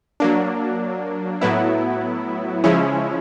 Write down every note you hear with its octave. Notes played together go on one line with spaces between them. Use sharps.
F#3 A#3 D4
A2 F#3 B3 E4
C#3 F3 G#3 C#4 E4